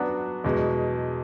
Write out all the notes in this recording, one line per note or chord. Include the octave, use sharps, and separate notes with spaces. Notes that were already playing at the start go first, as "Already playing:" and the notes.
Already playing: F#3 B3 D4 F#4
E2 B2 G#3